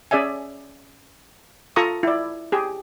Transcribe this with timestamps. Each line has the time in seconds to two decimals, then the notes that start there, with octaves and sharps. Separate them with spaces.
0.11 C#4 G#4 D5 E5 G#5
1.76 F4 A4 A#5 C#6 D#6
2.03 E4 D5
2.52 G4 G#4